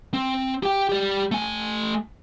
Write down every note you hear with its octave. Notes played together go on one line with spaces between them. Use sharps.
C4
G4 G5
G4 D5
A3 G#5